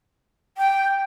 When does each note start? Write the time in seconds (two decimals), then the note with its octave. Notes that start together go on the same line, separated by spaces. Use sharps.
0.58 G5